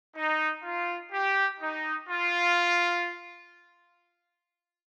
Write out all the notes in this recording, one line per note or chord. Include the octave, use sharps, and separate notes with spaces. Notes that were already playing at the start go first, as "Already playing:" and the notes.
D#4
F4
G4
D#4
F4